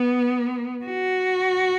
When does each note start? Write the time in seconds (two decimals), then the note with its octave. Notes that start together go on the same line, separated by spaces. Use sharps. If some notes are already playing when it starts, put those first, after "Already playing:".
Already playing: B3
0.86 F#4